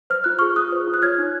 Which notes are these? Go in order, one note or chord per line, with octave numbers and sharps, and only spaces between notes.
C5 F6
F4 F#6
G#4 C#6 F6
F4 D#6 F#6
C5
F4
F#6
C#5 F6 G#6
D#4